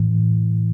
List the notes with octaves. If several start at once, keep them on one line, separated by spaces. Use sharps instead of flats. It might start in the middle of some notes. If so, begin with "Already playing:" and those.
Already playing: A2 E3